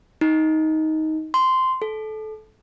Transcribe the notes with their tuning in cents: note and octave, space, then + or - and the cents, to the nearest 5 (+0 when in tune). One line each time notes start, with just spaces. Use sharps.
D#4 +10
C6 -10
A4 -20